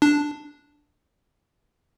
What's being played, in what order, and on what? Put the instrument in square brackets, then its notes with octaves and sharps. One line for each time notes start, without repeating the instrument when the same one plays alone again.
[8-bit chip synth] D4